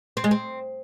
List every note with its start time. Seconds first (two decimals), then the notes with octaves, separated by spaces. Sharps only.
0.17 C4
0.24 G#3
0.31 C4